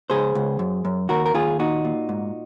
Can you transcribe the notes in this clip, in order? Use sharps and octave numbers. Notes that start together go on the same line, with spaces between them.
C#2 G#4 C5
C#2
F#2
F#2
D#2 F#4 A#4
A#4
D#2 F4 G#4
A#2 D#4 F#4
A#2
G#2